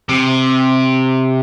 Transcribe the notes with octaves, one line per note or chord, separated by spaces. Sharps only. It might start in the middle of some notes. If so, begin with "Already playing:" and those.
C3